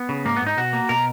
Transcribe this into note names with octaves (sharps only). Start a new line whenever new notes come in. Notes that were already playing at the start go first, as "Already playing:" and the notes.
Already playing: B3
C#3
G#2 A#3
B3
G#2 D#4
B2 F#4
A#3
B2 A#4